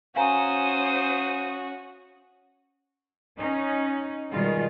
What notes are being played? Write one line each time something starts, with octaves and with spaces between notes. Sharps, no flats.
C#4 F#4 C5 F5 G#5 A#5 D#6
C#4 D#4
B2 D#3 G3 G#3 F4 G#4